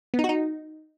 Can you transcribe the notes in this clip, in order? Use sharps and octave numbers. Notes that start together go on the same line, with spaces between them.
B3
D#4
F#4
D#4